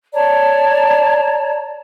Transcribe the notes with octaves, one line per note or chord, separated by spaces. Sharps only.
C#5 D5 A5 A#5